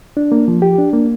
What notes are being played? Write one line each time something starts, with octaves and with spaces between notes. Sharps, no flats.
D4
A#3
F3
G4
D4
A#3